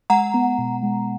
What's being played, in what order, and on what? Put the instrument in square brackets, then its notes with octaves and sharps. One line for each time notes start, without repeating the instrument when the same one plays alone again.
[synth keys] G#3 [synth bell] F#5 A#5
[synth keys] B3
B2
G#3